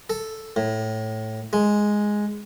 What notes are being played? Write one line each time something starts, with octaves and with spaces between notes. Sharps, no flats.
A4
A2
G#3